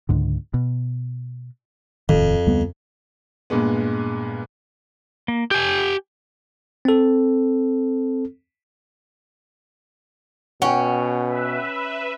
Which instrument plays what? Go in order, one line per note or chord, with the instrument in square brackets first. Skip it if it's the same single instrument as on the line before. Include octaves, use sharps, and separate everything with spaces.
[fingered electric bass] C#2 G#2 D3
B2
[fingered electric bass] D#1 A2 D#3 [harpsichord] F2
[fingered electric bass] D2 G3 B3
[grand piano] G2 A#2 G#3 B3
[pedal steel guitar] A#3
[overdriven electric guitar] G4 G#5 [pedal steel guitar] G6
[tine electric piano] C4 A4
[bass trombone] B2 [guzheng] C#4 [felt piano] F#5 G5
[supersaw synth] B4 E5